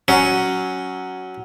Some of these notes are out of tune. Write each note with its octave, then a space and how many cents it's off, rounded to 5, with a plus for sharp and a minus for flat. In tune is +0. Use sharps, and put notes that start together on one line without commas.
F#3 +5 C#4 +5